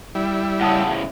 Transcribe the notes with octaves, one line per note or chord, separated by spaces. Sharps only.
G3 E4
A2 C#3 F#5 A5 D#6